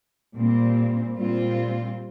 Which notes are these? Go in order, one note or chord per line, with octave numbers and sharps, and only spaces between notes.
A#2 G3 C4
A#2 G3 C4 F4